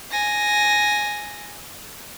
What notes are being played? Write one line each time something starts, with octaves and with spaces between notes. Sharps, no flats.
G#5 A#6